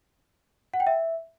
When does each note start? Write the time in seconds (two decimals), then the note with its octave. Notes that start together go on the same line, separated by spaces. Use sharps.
0.74 F#5
0.80 G5
0.87 E5